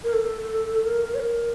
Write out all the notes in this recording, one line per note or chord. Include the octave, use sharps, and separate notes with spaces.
A#4
A4
A#4
C#5
A#4